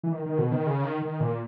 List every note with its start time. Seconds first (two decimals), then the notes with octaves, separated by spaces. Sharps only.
0.04 E3
0.12 D#3
0.26 D#3
0.38 B2
0.52 D#3
0.67 C#3
0.84 D#3
1.02 D#3
1.20 A#2